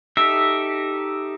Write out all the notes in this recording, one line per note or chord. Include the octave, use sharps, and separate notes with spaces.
D#4 G4 A4 E5